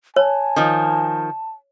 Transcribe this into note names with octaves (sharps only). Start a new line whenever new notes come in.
C#5 G#5 A5
D#3 F3